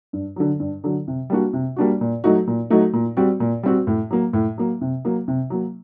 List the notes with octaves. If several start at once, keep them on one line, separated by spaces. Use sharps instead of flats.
G2
D3 F#3
G2
D3 F#3
C3
G3 A#3 D4 F#4
C3
G3 A#3 D4 F#4
A#2
F#3 A3 D#4 F#4
A#2
F#3 A3 D#4 F#4
A#2
G3 C4 F#4
A#2
G3 C4 F#4
A2
F#3 A#3
A2
F#3 A#3
C3
F#3 A#3
C3
F#3 A#3